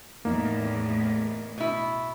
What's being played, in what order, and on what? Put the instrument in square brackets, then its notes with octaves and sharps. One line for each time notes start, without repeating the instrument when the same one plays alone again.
[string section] E2 A2 [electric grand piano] A#3 D#4
[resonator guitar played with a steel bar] B2 E4